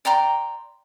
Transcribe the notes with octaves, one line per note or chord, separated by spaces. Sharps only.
D5 G5 A#5 C6